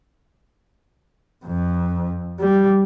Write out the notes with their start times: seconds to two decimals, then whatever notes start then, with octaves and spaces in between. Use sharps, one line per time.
1.46 F2
2.40 G3